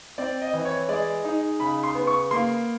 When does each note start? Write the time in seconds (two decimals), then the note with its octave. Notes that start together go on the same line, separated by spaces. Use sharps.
0.18 C4 D5
0.42 D#5
0.53 E3
0.65 C#5
0.89 G#3 D5
1.24 D#4
1.60 C#3 B5
1.84 C6
1.95 B3
2.07 C#6
2.31 A#3 C6